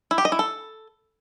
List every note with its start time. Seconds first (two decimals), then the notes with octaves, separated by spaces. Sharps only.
0.11 E4
0.18 G4
0.25 D#5
0.32 E4
0.39 A4